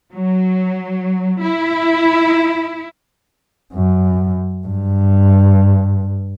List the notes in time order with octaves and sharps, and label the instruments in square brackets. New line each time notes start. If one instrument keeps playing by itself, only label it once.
[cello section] F#3
E4
[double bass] F#2
G2